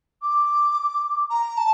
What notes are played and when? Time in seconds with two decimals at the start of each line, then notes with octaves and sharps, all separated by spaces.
0.22 D6
1.30 A#5
1.57 A5